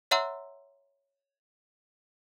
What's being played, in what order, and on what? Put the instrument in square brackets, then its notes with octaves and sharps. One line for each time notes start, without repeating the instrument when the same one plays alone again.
[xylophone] C#5 E5 F#5 A#5 C6 E6